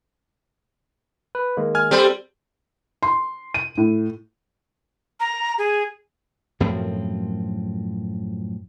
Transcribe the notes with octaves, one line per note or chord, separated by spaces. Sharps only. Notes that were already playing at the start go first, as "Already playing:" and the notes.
B4
D#3 G#3 A#3
G#5 F6 G#6
G3 C4 A4 C5
C6
D#7
A2
A#5
G#4
F#2 A2 F3 C4